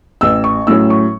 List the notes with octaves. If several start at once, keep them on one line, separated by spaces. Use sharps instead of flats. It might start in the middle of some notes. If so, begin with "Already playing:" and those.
A1 E6
C#6
A2 F#3 C#4 E6
C#6